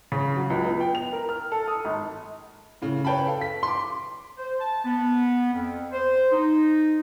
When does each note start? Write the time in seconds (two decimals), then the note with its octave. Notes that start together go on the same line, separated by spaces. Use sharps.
0.12 C#3
0.37 F#3
0.50 C#2
0.66 B3
0.80 G5
0.95 F7
1.13 A#4
1.29 F6
1.52 A4
1.68 D#6
1.85 G#1
2.82 A2 C#3
3.05 B4 C#5 G5 A5 B5
3.27 A4 F5
3.41 B6
3.63 C6 D6
4.37 C5
4.60 A5
4.85 B3
5.53 F2
5.92 C5
6.32 D#4